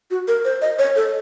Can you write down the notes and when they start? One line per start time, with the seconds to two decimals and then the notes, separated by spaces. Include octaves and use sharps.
0.11 F#4
0.28 A#4
0.45 C5
0.62 D#5
0.79 C#5
0.96 A4